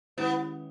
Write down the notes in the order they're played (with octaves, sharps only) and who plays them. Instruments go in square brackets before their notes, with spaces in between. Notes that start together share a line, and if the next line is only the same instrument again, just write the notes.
[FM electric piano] D#3 G#3 C#4 E4 G4 [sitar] B3